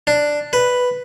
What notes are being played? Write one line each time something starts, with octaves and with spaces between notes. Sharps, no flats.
D4
B4